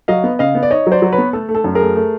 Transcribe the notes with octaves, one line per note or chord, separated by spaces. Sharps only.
F#3 D#5 F5
B3
C#3 D#5 F5
B3
D5
D#4 C#5 D#5
F#3
C5 D5
F#3
B4 C#5
B3
A3 A4
A3
A4
F#2
G#4 A#4
A3
A3